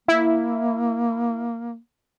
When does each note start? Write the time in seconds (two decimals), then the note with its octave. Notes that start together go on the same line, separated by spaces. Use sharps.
0.08 A#3 E4